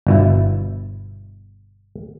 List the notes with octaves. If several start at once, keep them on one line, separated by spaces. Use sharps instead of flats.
G1 B2 E4